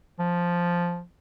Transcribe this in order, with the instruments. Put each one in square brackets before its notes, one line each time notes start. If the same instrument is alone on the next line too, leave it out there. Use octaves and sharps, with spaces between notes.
[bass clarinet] F3